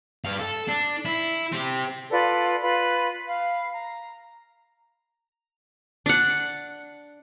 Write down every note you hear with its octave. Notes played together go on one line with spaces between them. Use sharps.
G2 F5
A4
D4
E4
C4 G4
F4 A4 B4 D5
F4 B4
F5 B5
A#5
D4 F#5